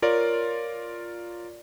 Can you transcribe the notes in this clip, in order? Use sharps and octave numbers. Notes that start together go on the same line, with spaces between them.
F4 A#4 C#5 D5